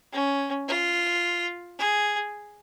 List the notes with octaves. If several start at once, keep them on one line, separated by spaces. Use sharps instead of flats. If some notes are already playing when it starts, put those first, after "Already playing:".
C#4
F4
G#4